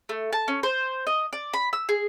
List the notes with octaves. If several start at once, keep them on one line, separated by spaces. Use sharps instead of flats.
A3
A5
C#4
C5
D#5
D5
B5
E6
G#4